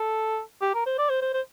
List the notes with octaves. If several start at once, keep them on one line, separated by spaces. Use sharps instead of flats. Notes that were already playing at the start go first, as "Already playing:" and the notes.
Already playing: A4
G4
A#4
C5
D5
C5
C5
C5